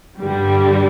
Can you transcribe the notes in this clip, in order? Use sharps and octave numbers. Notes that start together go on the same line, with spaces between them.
G2 D3 G3